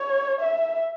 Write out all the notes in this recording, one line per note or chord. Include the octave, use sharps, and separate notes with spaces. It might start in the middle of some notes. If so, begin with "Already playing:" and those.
Already playing: C#5
E5